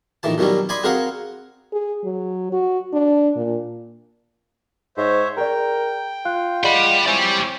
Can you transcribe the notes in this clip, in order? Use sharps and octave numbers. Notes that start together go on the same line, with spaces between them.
A#1 D#3 E3 A5
B2 D#3 F#3 G3 C#4
D5 D#5 G#5 B5 C6
C4 F#4 G#4 A#4 F5 F#5
G#4
F#3
F#4
D4
A#2
G#2 C5 C#5 E5
G#4 A#4 D5 G5
F4 F#6
G#4 D5 D#5 F#5 G5 B5
C4 E4 G4 C#5 D5 E5 G#5